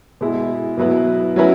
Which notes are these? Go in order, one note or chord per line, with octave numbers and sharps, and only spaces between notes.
B2 G#3 E4
B2 F#3 B3 E4 B4
F#3 C#4 E4 B4